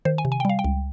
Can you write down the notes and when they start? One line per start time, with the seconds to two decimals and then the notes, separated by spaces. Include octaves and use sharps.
0.05 D#3 C5
0.18 G#5
0.25 C3
0.32 G#5
0.40 G5
0.45 G3 F5
0.59 G5
0.64 C#2